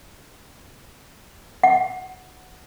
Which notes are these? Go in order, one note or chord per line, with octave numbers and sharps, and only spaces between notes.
F#5